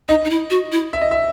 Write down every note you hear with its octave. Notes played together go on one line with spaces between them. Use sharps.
D#4 D#5
D#4
E4
F#4
E4
E5
D#5
E5